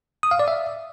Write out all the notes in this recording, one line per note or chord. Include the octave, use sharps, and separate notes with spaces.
D#6
F5
D5
E5